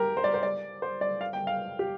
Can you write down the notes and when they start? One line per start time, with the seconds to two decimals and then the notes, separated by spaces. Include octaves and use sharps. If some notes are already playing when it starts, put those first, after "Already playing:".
Already playing: G4 A#4
0.17 C5
0.24 D5
0.34 C5
0.43 D5
0.82 C5
1.01 D5
1.21 F5
1.33 G5
1.47 F5
1.79 G4